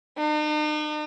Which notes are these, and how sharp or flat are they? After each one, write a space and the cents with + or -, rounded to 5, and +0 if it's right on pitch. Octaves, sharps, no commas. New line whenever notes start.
D#4 -45